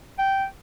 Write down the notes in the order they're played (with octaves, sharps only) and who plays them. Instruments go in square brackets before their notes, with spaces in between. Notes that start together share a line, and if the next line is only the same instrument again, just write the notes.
[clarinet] G5